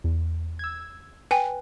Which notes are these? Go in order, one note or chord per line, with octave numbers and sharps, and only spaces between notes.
E2
E6 G#6
B4 G5 G#5